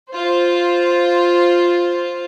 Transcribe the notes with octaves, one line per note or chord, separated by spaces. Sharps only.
F4 C5